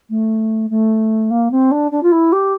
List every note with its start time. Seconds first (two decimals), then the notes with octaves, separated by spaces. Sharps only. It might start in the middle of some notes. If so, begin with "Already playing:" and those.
0.10 A3
0.70 A3
1.30 A#3
1.51 C4
1.71 D4
1.92 D4
2.03 F4
2.12 E4
2.32 G4